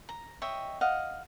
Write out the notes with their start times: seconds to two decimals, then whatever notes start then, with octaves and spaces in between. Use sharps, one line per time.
0.09 A#5
0.42 C#5 D#5 E5 G5
0.81 D#5 F5 F#5